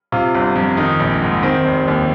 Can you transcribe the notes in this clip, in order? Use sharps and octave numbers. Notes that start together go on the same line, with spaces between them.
C3 F4
G1
F2
D#3 D#4
A#1
G#2
D#3 C4
F1
D#2